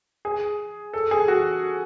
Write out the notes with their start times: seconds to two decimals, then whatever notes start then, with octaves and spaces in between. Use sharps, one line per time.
0.25 G#4
0.93 A4
1.11 G#4
1.28 F#4